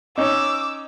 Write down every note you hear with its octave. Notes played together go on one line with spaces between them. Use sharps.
C#4 D#4 D6 E6